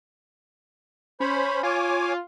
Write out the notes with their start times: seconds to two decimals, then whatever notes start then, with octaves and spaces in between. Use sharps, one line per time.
1.20 C#4 C5 B5
1.63 F4 C#5 G#5 D6